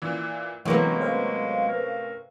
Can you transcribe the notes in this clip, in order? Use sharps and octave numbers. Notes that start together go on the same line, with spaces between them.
A#2 E3
A2 C3 E3 F#3 G#3 A#3 B3 C#4
B4 C5 F5
A#4